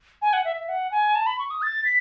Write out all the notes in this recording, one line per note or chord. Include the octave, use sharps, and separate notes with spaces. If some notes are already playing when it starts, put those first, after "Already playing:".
G#5
F#5
E5
E5
F#5
G#5
A5
B5
C#6
D#6
A6
B6